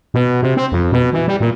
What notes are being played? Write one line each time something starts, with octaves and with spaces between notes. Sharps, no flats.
B2
C3
C4
F2
B2
E3
G3
A#2